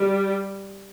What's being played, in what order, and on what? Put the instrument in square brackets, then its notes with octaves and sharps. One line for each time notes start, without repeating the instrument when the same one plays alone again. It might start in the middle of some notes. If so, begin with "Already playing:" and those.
Already playing: [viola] G3